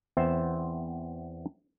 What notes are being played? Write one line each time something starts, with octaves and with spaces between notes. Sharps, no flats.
E2 B3 C4 C5 E5